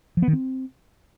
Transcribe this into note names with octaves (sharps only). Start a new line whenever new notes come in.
F3
B3
D#3
C4